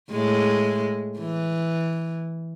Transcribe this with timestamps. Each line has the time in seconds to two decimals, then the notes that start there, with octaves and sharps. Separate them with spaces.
0.11 A2 G#3
1.19 E3